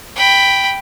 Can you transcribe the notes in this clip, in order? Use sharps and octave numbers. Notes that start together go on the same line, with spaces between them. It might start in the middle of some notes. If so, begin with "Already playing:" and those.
G5 B5